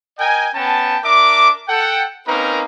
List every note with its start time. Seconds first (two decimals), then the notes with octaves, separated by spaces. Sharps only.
0.19 A#4 D#5 G5 G#5
0.54 B3 C#4 G5 A5
1.04 D4 A#4 E5 D6
1.68 A4 F#5 G5
2.27 A#3 C4 C#4 D#4 A#4 B4